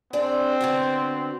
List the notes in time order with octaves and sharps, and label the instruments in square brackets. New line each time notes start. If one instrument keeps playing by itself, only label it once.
[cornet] C4 [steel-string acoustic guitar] D4 G#4 D5
[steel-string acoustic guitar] D3 B3 F#4